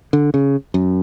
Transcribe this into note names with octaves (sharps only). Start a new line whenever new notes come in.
D3
C#3
F#2